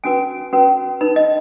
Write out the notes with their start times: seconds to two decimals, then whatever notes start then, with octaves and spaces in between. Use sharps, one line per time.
0.04 C#4 F#4 B4 G#5
0.53 C#4 F#4 B4
1.01 D#4 B4 B5
1.16 D#5